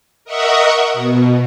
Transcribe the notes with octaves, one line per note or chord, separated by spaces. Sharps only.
A#4 D#5 E5 F#5 C#6 D#6
B2